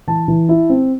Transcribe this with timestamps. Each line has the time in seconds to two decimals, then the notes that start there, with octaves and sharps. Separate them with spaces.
0.07 E3 A5
0.28 E3
0.49 E4
0.70 C4